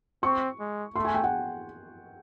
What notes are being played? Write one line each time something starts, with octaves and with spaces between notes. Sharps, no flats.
C4 C#6
G#3
A3 C6
G#5
G5
F#5